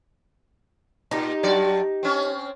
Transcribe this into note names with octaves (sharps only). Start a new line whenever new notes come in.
A#2 D#4 G4
G2 F#3 D5
C4 C#4